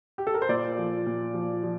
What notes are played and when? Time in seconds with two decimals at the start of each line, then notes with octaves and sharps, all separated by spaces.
0.18 G4
0.27 A4
0.34 A#4
0.42 C5
0.49 A#2 D5
0.78 F3
1.06 A#2
1.34 F3
1.63 F3